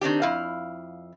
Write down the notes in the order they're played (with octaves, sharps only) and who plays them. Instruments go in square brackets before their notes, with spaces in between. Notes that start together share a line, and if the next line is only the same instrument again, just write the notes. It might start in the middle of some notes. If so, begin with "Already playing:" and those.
[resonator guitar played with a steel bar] D#3 C4 D4 G4
F2 E4 F5